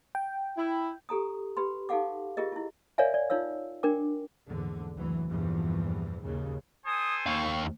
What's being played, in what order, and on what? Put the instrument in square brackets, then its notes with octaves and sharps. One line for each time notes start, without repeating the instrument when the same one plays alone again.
[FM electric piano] G5
[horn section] E4
[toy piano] G4 A4 A#5 D#6
G4 B4 B5 C6
D#4 G4 A4 F5 F#5 D6
F4 G4 G#4 A#4 D#5
E4 F4
A#4 C#5 D5 E5 F5 G#5
D5
D#4 F4 C#5 F5 E6
D4 A#4 G5 D6
[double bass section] A#1 E2 G#2 D3
F#1 D2 E3 F#3
E2 G2 A#2 E3 F3
D#2 C#3
[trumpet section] A4 C5 G#5 [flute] D#6
[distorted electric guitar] D#2 F5 [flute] C#6